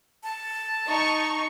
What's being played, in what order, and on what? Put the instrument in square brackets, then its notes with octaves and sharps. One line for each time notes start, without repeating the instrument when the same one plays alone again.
[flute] A5
[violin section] D#4 C#6